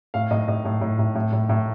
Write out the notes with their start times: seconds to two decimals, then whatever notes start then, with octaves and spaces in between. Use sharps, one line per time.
0.14 A2 F5
0.31 A2 D#5
0.48 A2 D#5
0.65 A2
0.81 A2
0.99 A2
1.15 A2
1.33 A2
1.49 A2